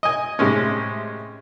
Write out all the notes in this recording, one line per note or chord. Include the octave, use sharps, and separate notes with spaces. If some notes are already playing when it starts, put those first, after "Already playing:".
D#5 G#5
A2 C3 G#3 C#4